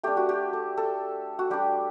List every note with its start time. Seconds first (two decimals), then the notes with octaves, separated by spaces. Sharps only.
0.03 A3 D4 G4
0.17 F#4
0.29 G4
0.53 A4
0.77 A4
1.39 F#4
1.50 G3 D4 G4